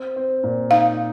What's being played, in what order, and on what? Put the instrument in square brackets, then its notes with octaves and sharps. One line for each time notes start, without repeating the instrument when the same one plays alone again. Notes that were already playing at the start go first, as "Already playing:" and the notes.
Already playing: [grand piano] C4
C4
A#2
[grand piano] D#4 [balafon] F5